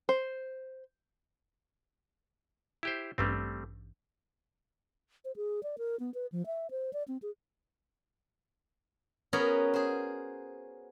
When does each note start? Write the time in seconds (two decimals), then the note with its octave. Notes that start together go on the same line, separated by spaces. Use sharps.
0.09 C5
2.83 E4 G4 C5
3.18 A1 G2 G3 A3 C4
5.25 C5
5.36 G#4
5.63 D5
5.78 A#4
6.00 B3
6.14 B4
6.32 F3
6.46 E5
6.71 C5
6.93 D5
7.08 C4
7.22 G#4
9.33 B3 C#4 F#4 G#4 A#4 C#5
9.74 G#4 C5